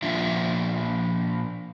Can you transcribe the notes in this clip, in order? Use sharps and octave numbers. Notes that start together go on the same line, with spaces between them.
A#2 F3 D4 F4 E5